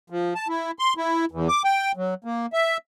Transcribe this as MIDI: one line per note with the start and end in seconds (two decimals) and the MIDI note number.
0.10 0.34 53
0.35 0.48 81
0.48 0.71 64
0.79 0.94 84
0.97 1.25 64
1.32 1.48 40
1.49 1.62 86
1.64 1.92 79
1.97 2.14 54
2.24 2.46 58
2.53 2.77 76